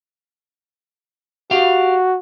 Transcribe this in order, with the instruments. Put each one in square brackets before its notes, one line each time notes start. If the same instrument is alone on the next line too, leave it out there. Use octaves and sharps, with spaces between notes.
[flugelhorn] F#4 [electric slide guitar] G4 F5